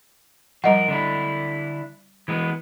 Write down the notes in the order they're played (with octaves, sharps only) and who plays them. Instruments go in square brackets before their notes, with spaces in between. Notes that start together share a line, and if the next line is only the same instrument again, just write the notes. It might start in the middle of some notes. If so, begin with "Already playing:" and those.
[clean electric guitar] F3 A#4 [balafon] G3 D#5 F#5
[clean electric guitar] D3 D4 E4
E3 G#3 B3